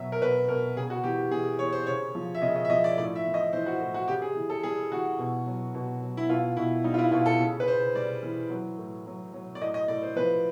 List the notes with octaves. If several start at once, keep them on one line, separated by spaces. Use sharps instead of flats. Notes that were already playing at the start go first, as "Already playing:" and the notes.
Already playing: B2 F#3 E5
A#4
B2 B4
B2 A#4
C#3 G#4
F#4
E3 G4
E3 G#4
E3 C#5
C5
C#3 C#5
F3
E5
C#3 D#5
D#5
E5
F3 D#5
D5
A2 D5
E5
E3
D#5
E3 C5
F#4
A2
F#4
C#3 G4
G#4
E3
A4
G3 G#4
E3 F#4
B2
F#3
B2
F#3
E4
B2 F4
B2 E4
G3 D#4
F4
E4
B2 F4
A4
C#3
B4
C#3 C5
G3 D5
E3
F#3
A2
F#3
F#3
D5
A2 D#5
D#5
A2 D5
C5
F3 B4